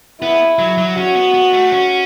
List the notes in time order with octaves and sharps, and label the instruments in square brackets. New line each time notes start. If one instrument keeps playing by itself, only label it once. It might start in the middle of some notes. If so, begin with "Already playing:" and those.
[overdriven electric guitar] B3 [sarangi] E4
[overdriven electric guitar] F#3
F#3
[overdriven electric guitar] C#4 [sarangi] F#4
[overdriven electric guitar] B3
B3
A3
C#4